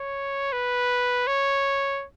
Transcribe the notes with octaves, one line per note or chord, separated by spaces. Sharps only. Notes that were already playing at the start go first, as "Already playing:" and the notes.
Already playing: C#5
B4
C#5